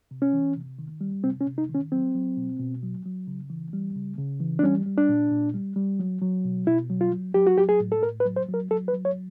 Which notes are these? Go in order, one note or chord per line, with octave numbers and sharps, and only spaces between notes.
C3
C#4
E3
C3
D#3
G3
C3 C4
C#4
C3
D#4
D#3
C#4
F#3 C4
F#3
B2
B2
F#3
F#3
C#3
E3
G3
C#3
C#3
E3
D4
G3 C#4
G3
D4
A#2
A#2
G3
G3
F#3
F#3
B2
B2 E4
F#3
F4
F#3
F#3 G4
F#4
F#3 G4
G#4
A2
A4
A2 A#4
B4
F#3
C5
F#3
A#4
F#3 A4
B4
F#3
C#5